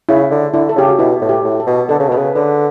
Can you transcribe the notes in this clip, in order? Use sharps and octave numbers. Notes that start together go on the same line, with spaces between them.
C#3 E4
D3
D3 E4
A4
C#3 G4
F#4
B2 E4
A2
G4
A2
A4
B2
D3 A4
C#3
B2 B4
C#3
D3 B4